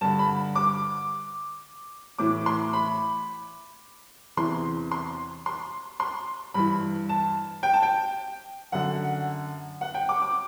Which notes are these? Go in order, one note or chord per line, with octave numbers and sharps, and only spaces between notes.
G2 D3 A5
B5
D6
A2 E3 D6
C6
B5
E2 C3 E3 C6
C6
C6
C6
G2 E3 B5
A5
G5
A5
G5
F#2 D3 F#5
F#5
G5
D6
D6